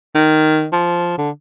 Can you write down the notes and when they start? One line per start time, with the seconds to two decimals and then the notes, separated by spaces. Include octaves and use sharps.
0.15 D#3
0.73 F3
1.18 D3